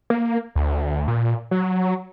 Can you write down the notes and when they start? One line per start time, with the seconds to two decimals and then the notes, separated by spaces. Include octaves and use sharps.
0.10 A#3
0.56 D2
1.08 A#2
1.51 F#3